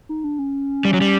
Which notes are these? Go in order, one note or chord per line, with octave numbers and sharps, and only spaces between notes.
D#4
D4
C#4
G3
F#3
G3